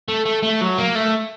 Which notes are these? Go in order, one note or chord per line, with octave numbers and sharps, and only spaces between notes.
A3
A3
A3
F#3
A#3
A3